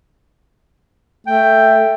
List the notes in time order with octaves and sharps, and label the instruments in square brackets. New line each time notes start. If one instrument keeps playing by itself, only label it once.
[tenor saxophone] A3 [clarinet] G5